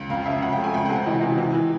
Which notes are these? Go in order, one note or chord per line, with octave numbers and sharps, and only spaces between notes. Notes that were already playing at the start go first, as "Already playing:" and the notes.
Already playing: C#2
F2 F5
C#3 E5
F2 F#5
G5
A3
G#5
C#2 G5
F#5
C3
F#5
E3 D#5
E3
E3
E3